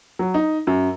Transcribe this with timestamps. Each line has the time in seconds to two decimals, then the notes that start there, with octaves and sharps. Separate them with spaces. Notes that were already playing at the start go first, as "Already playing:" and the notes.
0.19 F#3
0.34 D#4
0.67 F#2